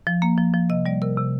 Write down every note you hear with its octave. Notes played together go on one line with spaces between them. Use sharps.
F3
A#3
F3
F3
C3 D#5
G3 D5
C3 A#4
C3